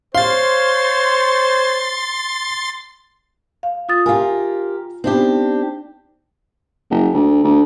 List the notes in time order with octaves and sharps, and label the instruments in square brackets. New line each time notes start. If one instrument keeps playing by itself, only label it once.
[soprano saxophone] C5 [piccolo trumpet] C#5 [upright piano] F5 [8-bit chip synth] C6 A6
[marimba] F5
F4 D#6 A6
[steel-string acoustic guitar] F4 G4 A#4 [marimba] G#5
[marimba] B3 D#4 [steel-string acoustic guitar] C4 D4 G4
[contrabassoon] F#1
D2
D2